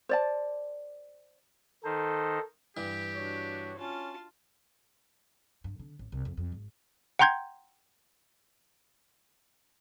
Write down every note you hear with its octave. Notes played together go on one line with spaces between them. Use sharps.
C5 D5 A5
D#3 D#4 A4 C5
G2 E3 G3 G4
D4 F#4 C#5
C#4 F4 A5
G2
D3
A1
C2
F2
F2
G#1
F#5 G5 A#5 C6 G6 G#6